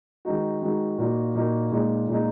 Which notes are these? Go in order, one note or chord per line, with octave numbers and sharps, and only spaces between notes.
D#3 G#3 D#4 F#4
D#3 G#3 D#4 F#4
A#2 A#3 D#4 F#4
A#2 A#3 D#4 F#4
A#2 G#3 D#4
A#2 G#3 D#4